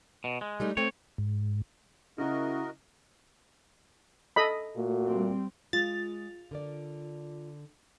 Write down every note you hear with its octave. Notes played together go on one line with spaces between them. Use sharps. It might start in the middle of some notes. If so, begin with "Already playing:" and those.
B2
G#3
G3 A3 D#4
A3 C4 C#5
G#2
C#3 E4 F#4 A#4 D#5
A4 D#5 B5
A#2 A3 F#4
G3 C4
G#3 F4 A6
D3 A#4 D5